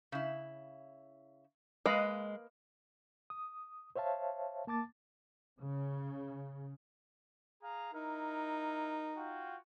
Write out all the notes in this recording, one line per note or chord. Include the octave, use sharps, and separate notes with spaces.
C#3 E4
G#3 A#3 B4 D#5 F5
D#6
C5 C#5 E5 F5 A5
A#3 A5 D6 A6
C#3
G#4 F5 A#5
D#4 E4 A#4
F4 F#4 G5